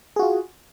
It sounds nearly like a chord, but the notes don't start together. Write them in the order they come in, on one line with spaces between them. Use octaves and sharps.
G#4 F#4 F4